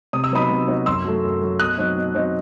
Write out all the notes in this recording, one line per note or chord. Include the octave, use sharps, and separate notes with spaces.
C3 D#6
E6
F#3 B3 D#4 B5 D#6
C3
F#3 B3 D#4
F#2 C6 E6
F#3 A3
F#2
F#3 A3
B2 D#6 F#6
F#3 C4 D#4
B2
F#3 C4 D#4